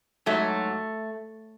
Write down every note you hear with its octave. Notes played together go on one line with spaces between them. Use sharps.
G#2 F#3 A3